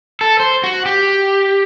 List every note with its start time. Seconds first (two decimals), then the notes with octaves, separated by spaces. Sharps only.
0.21 A4
0.40 C5
0.64 F#4
0.86 G4